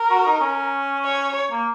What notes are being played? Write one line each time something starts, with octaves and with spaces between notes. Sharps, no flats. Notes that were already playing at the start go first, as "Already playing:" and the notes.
Already playing: A#4
F#4
D#4
C#4
C#5
A#3